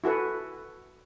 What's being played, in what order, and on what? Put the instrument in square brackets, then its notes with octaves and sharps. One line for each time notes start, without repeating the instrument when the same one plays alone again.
[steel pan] E4 F#4 A4 B4